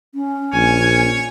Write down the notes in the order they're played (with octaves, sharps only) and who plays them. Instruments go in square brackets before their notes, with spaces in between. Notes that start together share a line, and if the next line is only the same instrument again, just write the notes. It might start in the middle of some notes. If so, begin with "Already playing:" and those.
[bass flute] C#4
[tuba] A#1 [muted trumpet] C#5 [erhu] G#5